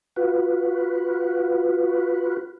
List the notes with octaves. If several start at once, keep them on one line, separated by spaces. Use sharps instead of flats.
F4 F#4 B4